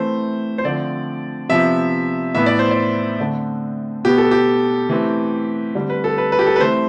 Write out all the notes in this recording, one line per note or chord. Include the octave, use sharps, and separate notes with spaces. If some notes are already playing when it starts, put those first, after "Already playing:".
Already playing: E3 A3 C4 C5
C5
D3 F3 A3 C4 D5
C3 F3 B3 E5
A2 E3 B3 E5
D5
C5
D5
D3 A3 C4
B2 B3 G4
A4
G4
E3 A3 C4
D3 G3 C4
B4
A4
B4
B4
G4
A4
B4
E3 A3 C4 C5